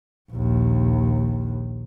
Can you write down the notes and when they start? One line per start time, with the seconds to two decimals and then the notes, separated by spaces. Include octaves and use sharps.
0.32 A#1 D#2